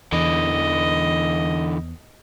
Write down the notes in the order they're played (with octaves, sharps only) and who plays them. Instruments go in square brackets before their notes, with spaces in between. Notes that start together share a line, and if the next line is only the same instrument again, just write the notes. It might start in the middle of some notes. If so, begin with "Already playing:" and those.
[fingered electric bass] E2 [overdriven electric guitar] D3 E3 [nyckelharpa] D#5